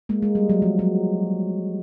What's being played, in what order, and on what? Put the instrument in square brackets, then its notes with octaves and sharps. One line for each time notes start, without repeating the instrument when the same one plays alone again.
[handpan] G#3 A#3
G#3
G3
F#3
F3
F#3